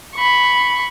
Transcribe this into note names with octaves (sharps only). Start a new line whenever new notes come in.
B5 C#6